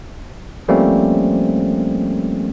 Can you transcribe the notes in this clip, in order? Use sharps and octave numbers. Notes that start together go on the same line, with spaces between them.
F3 G3 A3 A#3 C4 C#4